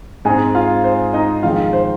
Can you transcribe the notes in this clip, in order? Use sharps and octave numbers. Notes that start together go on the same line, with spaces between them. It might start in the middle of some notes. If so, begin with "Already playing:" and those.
G#2 G#3 C4 G#4 G#5
F4 F5
C5
D#4 D#5
F2 D#3 G#3 F4 F5
C5